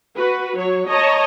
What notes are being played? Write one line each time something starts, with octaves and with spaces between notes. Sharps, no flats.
F#4 B4
F#3 C#5
C#5 D#5 A5 A#5